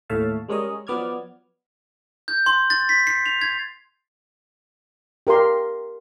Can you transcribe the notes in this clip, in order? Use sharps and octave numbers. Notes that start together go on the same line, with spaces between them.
D#2 A2 C#5 E5 F5 A5
G3 G#3 C#4 A#4 C#5 D#5
F3 F#3 B3 D5 F6 G#6
G6
C6
A6
B6
C7
F7
G#6
G4 A#4 F5 C6